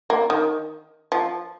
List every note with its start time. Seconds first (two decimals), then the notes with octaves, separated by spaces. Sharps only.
0.10 A#3
0.30 D#3
1.12 F3